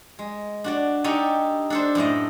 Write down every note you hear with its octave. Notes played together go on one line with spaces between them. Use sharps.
G#3
D4 F#4 D5
D4 D#4 G4 A4 C#5 G#5
D4 A4 C5
F#2 A2 A3 D#5